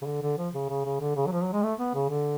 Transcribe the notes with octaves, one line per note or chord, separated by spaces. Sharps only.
C#3
D3
D3
F3
C#3
C#3
C#3
D3
C#3
F#3
F3
F#3
G#3
A3
B3
C#3
D3